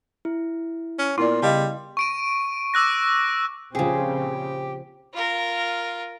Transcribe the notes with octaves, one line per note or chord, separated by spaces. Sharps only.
E4
C#4
A#2 B3 E4 A#4 D5 C6
C#3 G3 D#5 F5 A5
C#6 D7 D#7
D6 E6 F#6 A#6
A#1 C#3 F3 C4 G4 G#4
F4 A#4